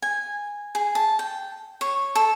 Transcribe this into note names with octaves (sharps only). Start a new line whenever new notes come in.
G#5
G#4
A5
G5
C#5
A4